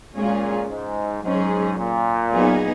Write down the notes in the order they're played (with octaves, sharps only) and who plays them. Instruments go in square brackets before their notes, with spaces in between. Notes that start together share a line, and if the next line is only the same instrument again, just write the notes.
[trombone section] A#2 [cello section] G#3 C#4 F4 G#4
[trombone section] G#2
[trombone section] G#2 [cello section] F#3 C#4 G#4
[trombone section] A#2
[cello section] F#3 B3 D#4 G#4